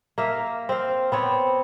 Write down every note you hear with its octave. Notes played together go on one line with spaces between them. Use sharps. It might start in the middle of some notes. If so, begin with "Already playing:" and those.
A#3 E5 F5
C4 F5
B3 C4 C#5